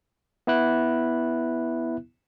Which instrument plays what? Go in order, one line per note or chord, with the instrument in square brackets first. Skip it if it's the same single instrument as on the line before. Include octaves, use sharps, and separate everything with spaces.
[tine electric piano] B3 E4 F#6